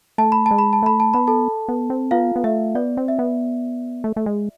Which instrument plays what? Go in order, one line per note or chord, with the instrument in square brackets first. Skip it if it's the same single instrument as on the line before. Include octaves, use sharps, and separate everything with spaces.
[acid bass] A3 [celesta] A5
[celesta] B5
[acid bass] G#3 [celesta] A5
[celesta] B5
A5
[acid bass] A3 [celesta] B5
[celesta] A5
[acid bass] B3 [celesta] B5
[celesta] A4 A5
[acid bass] B3
C4
[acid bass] B3 [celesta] F4 F5
[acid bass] B3
[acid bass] A3 [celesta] E5
[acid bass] B3 [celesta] D5
[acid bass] C4
[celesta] E5
[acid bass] B3
A3
A3
G#3